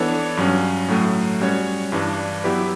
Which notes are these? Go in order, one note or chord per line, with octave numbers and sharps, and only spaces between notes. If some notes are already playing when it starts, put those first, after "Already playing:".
Already playing: E3 B3 D4 A4 C#5
G2 F#3 C#4
A2 F#3 A3
G3 C#4 F#4 C#5
G2 E3 G3 D4
F#3 B3 E4 G4 B4